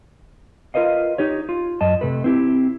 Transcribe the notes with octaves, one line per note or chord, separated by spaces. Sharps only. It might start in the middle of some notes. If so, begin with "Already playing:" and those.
F4 A#4 B4 D#5 F5
D#4 G4 C#5
F4
F#2 D#5 A5
C3 A3 B4
C4 E4 G4